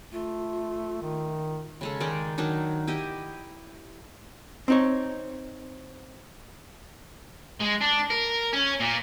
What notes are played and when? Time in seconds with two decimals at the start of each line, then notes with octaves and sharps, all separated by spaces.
0.12 A3 F4
1.02 D#3
1.81 C#3 G#3 A4
2.00 D#3 G#3 D#4 D5
2.38 D#3 F#3 D4 D#4
2.87 E4 G4 D#5 E5
4.68 C4 D#4 C#5
7.60 G#3
7.81 D4
8.10 A#4
8.53 C#4
8.80 A#2